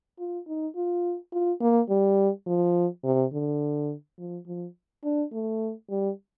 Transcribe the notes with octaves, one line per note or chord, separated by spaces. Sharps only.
F4
D#4
F4
F4
A#3
G3
F3
C3
D3
F3
F3
D4
A3
G3